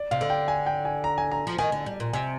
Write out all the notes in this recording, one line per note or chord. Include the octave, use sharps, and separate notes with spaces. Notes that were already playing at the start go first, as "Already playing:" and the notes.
Already playing: D5
C3 F5
D3
G5
G#5
G5
G#5
A#5
G#5
A#5
F3
D#3 G#5
D3
G3
A#2
C3 G#5